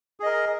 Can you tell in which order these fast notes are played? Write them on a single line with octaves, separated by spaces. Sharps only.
G#4 D#5 A#4